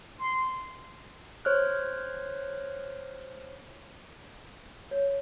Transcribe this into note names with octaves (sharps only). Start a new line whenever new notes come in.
C6
C5 C#5 F6 F#6
C#5